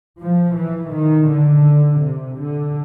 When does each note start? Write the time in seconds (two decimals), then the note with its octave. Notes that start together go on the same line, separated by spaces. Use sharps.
0.21 F3
0.57 E3
0.93 D#3
1.31 D3
2.03 C3
2.39 D3